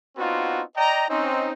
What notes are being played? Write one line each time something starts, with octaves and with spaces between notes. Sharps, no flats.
B3 C4 D4 D#4 F4 F#4
D5 D#5 G5 A#5
C4 C#4 D#4